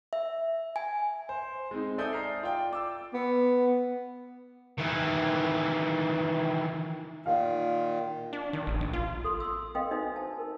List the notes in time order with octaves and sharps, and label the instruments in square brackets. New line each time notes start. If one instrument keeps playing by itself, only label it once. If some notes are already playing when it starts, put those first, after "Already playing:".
[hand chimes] E5
G#5
[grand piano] C5
G#3 C4 D#4
A4 D5 E5 G#5 D#6 G6
A#5 F6 C7
F4 D5 G5
D6 E6
[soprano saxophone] B3
[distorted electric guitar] D#3 E3
[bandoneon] A#2 D#3 [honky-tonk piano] F5
[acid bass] D4
D#3
A1
A#1
F4
[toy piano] A4 C6
C6 E6
A4 B4 D#5 F5 G5 C6
D4 D#4 F#4 A4 C5 E5
A5
A#4